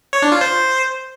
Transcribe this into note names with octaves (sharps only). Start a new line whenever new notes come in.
C#5
D4
F4
C5